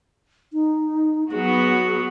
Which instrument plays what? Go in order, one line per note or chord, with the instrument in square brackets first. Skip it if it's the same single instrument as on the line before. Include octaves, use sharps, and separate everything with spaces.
[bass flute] D#4
[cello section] F#3 B3 F#4 [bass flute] G#4